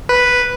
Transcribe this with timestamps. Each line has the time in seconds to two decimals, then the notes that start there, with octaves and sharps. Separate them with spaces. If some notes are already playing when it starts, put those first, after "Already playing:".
0.09 B4